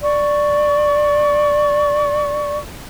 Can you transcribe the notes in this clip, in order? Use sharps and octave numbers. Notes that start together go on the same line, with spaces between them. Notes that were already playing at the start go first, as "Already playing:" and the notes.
D5 C#6